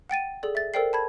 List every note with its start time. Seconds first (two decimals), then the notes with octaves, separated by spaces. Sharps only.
0.10 F#5 G5 A6 D#7
0.43 G#4 A4 D5
0.55 E5 A6
0.74 A4 A#4 C5 D5 G5 C7
0.93 A5 B5 G#6